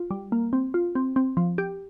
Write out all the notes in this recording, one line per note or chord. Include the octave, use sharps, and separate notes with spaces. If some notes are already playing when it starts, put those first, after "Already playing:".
Already playing: F4
G3
A#3
C4
F4
C4
C4
F3
G4